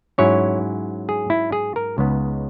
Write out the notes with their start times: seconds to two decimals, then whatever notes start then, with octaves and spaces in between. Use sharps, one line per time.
0.18 G#2 F#3 C#4 E4 C#5
1.09 G#4
1.30 E4
1.52 G#4
1.76 A#4
1.98 C#2 C#3 G#3 B3 D#4